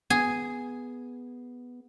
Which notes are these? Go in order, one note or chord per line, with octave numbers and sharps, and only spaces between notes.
B3 G#4